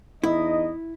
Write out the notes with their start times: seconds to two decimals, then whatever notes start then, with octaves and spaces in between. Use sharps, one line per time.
0.24 E2 D#4 E4 D#5